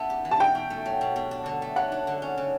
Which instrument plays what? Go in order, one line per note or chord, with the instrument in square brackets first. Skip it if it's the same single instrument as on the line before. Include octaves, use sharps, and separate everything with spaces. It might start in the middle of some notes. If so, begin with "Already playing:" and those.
Already playing: [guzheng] B3 E4 [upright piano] A5
[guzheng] G4
E3
[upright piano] A5
[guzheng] B2 [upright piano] G5
[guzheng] B2
A3
F#3
B2
B2
D4
D3
A3
[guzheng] F#3 [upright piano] F#5
[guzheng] D4
D3
C#4
C#3